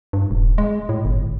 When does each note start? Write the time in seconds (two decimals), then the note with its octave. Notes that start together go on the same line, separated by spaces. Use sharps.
0.13 G2
0.31 D#1
0.58 G#3
0.89 A2
1.05 G1